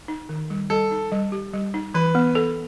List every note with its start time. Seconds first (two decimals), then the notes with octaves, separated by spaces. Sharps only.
0.08 D#4
0.29 D#3
0.50 G3
0.70 G3 A4
0.91 D#4
1.12 G3
1.32 G4
1.53 G3
1.74 D#4
1.94 E3 B4
2.15 B3
2.35 A4